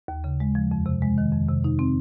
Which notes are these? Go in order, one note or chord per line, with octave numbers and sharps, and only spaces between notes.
D#2
C#3
G#3
F3
F2
C3
G#3
D#3
F2
C3
D#4
C4